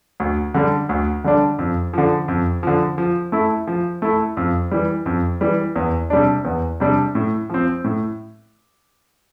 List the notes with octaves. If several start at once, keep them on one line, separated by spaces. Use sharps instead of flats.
D2
D3 G3 D4
D2
D3 G3 D4
F2
D3 F3
F2
D3 F3
F3
A3 E4
F3
A3 E4
F2
E3 G3
F2
E3 G3
E2
C3 G3 D4
E2
C3 G3 D4
A2
F3 C4
A2